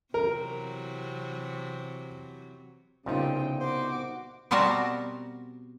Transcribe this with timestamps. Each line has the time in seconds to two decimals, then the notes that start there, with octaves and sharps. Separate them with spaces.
0.14 C3 E3 F#3 A#4
3.06 C2 A#2 C#3 F3 B3 D#4 G5
3.60 F#4 C5 D6
4.51 B2 G3 C4 F#4 A#4 A5